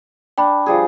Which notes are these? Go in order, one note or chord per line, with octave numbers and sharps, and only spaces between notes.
D4 G5 B5
F3 G3 G#4